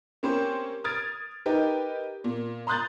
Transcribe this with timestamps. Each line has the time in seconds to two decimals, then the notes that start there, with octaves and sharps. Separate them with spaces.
0.23 A#3 C4 C#4 G4 C5
0.84 D#6 F6 G#6 A6 D7
1.46 D#4 G4 A#4 B4
2.24 A#2
2.67 A#5 C6 D#6 F#6 G6 A6